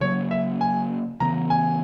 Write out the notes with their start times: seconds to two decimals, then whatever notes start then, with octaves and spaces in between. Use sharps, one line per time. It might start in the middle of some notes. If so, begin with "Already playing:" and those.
0.01 C#3 F#3 A#3 C#5
0.31 E5
0.61 G#5
1.20 C#3 E3 B3 A#5
1.50 G#5